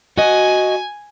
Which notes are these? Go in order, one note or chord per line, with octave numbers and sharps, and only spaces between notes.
F#4 D#5 G#5